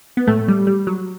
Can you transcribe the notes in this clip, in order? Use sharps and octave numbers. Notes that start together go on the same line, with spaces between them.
B3
A2 A3
G3
G3
F#3